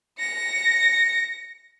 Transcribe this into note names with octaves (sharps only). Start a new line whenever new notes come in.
A#6 C#7